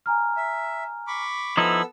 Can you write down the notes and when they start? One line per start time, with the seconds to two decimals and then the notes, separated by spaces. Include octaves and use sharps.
0.06 G#5 A#5 F6
0.37 E5
1.07 B5 C#6 D6
1.57 F3 B3 D#4 E4 A4 E6